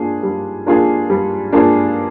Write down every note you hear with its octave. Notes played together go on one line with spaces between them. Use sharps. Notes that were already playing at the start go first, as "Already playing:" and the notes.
Already playing: A#3 D4 F4 G#4
G3
A#3 D4 F4 G#4
G3
A#3 D4 F4 G#4